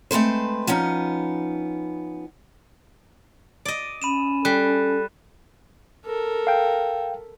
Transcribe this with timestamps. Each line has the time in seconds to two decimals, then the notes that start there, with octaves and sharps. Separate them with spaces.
0.11 G#3 A3 C4 B4 C5
0.67 F3 B3 C#4 D#4
3.65 D5 D#5
4.02 C#4 B5 D#7 E7
4.45 G3 A4 F#6
6.05 A4 A#4
6.47 F5 G5